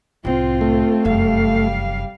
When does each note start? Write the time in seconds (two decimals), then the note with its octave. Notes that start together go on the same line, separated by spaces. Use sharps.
0.25 C2 A2 C4 F4
0.61 A3
1.05 F1 F#2 G3 F5